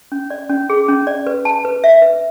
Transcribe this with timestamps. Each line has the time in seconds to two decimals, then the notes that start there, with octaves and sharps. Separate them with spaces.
0.12 C#4
0.30 D5
0.49 C#4
0.70 G#4
0.89 C#4
1.07 D5
1.27 B4
1.45 A5
1.65 B4
1.84 E5
2.02 B4